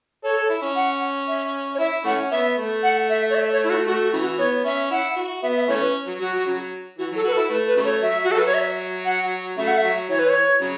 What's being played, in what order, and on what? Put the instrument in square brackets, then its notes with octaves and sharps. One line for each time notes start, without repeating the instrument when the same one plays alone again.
[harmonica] A4 [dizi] C#5
[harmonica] A4
E4
C#4
[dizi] F#5
E5
C#5
[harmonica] E4 [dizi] E5
[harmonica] E3 A3 C#4 [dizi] F#5
[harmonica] B3 [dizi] E5
[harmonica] A3
[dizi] F#5
E5
C#5
E5
C#5
E4
F#4
[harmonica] A3 [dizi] F#4
[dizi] F#4
[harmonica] C#3 E3
[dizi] F#4
[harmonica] B3 [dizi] C#5
[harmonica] C#4 [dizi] E5
[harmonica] E4 [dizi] F#5
[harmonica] F#4
[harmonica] B3 [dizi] E5
[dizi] E5
[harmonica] E3 A3 C#4 [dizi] C#5
[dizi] B4
[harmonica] F#3
[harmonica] F#3 [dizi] F#4
[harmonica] F#3
C#3 F#3
[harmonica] E3 [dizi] F#4
[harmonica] F#3 [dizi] A4
[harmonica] F#4 [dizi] B4
[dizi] A4
[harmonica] E4
[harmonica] A3 [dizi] B4
[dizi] B4
[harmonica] C#3 F#3 A3
[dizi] C#5
[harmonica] F#3 [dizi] E5
[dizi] F#4
[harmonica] F#3 [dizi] A4
[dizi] B4
C#5
E5
F#5
[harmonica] C#3 F#3 A3 [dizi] E5
[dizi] F#5
E5
[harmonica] F#3
[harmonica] E3 [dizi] C#5
[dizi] B4
C#5
[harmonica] C#3 F#3